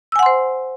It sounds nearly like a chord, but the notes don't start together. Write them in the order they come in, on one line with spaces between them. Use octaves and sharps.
E6 G#5 F#5 C6 C5